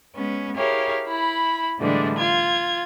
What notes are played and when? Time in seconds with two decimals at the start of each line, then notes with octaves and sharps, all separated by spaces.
0.16 G#3 B3 C#4
0.56 E4 G4 G#4 A#4 C#5 F5
1.08 E4 B5
1.79 A2 D3 E3 G3 G#3 D4
2.18 F4 G#6